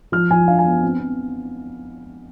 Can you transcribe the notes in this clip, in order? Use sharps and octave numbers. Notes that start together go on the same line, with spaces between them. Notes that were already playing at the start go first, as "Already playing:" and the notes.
F3 F6
F3 G#5
D4 F5
G#5
B3
C4
C4